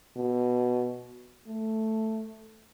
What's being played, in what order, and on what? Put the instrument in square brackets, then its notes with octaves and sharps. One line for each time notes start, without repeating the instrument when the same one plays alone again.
[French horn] B2
A3